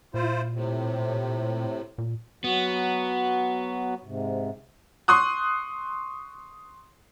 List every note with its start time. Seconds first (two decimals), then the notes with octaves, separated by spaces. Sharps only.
0.14 A#2 E4 F4 C5
0.53 A2 C3
1.98 A#2
2.44 F#3 B3 F#4
4.04 G#2 C3
5.08 C6 C#6 D#6 F#6